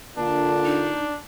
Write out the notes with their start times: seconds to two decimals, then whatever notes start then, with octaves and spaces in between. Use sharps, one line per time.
0.17 D3 A#3 D4 F4 A5
0.65 D#4